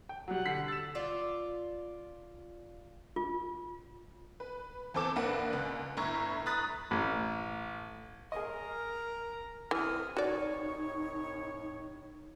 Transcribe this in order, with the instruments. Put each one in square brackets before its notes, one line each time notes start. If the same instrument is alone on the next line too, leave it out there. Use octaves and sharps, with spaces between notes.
[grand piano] G5
[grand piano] F#3 G3 [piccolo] F#5
[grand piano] D3 B6 C7
[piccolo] E6 [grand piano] A6 E7
[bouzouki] F4 D5
[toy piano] F4
[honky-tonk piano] B4
E2 C4 A4 D6 E7
A#1 A#3 B4 F#5
C#2 F#6
G1 A2 E4 A#5 C#6 G#6
A#5 B5 D#6 F#6 A6 B6
[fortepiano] A1
[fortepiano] G#4 D#5 [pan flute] A#4 [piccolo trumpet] A#5
[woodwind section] C2 D#6 F6 [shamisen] E3
[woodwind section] C2 A2 C#5 [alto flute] D#4 [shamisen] F#4 D5